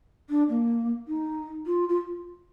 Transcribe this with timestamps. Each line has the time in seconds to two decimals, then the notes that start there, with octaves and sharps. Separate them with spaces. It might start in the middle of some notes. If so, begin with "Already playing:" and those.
0.30 D4
0.49 A#3
1.08 D#4
1.66 F4
1.89 F4